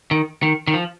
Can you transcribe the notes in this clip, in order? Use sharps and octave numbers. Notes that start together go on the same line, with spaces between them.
D#3
D#3
D#3
F3